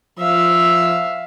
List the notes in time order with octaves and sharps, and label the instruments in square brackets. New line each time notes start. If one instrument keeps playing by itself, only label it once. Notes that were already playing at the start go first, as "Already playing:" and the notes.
[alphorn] F3 [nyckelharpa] E5 F5